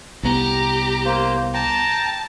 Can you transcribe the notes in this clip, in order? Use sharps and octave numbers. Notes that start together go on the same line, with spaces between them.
C2 B3 G4 A#5
A#3 C5
G5 A5 A#5